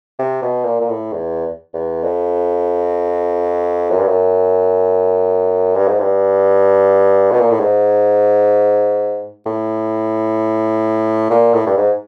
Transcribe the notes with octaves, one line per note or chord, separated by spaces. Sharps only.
C3
B2
A#2
A#2
A2
E2
E2
F2
F#2
G2
F#2
G2
G#2
G2
B2
A#2
A2
G#2
A2
A#2
A2
G2
G#2